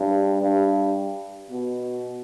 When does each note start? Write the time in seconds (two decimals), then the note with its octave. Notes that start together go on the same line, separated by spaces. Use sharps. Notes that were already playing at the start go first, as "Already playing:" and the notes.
Already playing: G2
0.42 G2
1.50 B2